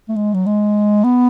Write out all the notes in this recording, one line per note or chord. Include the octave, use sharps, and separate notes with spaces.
A3
G#3
F#3
G#3
B3